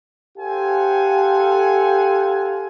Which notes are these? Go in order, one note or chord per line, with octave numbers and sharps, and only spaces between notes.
G4 A4 C5 F5 F#5 G#5